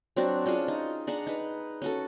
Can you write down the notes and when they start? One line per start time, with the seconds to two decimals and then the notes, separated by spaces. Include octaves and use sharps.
0.16 F#3 C4 D4 F#4
0.46 C#4 D4 F4 G#4
0.68 D#4
1.07 D4 G#4 F#5 A#5
1.27 D#4 B4
1.82 C#4 F#4 A4